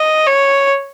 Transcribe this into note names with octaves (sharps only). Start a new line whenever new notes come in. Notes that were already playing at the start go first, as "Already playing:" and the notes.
Already playing: D#5
C#5